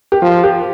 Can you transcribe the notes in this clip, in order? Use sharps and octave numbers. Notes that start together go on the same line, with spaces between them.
G4
F3 F4
G4